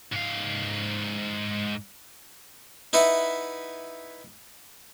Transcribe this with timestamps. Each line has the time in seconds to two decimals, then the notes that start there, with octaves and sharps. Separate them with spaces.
0.13 G#2 F5
2.93 D#4 E4 B4 E5 F#5